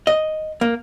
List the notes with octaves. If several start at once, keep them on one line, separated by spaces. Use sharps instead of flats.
D#5
A#3